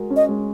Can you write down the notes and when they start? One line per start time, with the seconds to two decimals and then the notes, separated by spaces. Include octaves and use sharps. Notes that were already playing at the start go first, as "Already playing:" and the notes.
Already playing: G#3 F#4 A#4
0.10 C#4
0.16 D#5
0.29 G#3